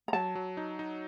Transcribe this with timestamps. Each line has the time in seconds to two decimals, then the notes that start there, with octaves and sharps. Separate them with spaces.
0.08 A#5
0.13 F#3 A5
0.35 F#3
0.57 D#4
0.79 D#4